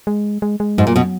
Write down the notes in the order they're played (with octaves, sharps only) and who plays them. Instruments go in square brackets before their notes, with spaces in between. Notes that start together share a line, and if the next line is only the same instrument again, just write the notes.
[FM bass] G#3
G#3
G#3
[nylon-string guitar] G#2 [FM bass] F#3
[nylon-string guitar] A#2
B2